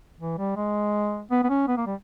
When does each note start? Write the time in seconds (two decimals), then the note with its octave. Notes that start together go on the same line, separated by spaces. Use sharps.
0.21 E3
0.38 G3
0.57 G#3
1.31 B3
1.44 B3
1.50 C#4
1.68 B3
1.77 A#3
1.86 G3